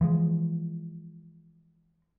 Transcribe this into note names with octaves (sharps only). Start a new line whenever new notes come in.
E3 F3 G#3